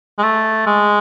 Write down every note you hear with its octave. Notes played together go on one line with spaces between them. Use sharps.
G#3
A3
G#3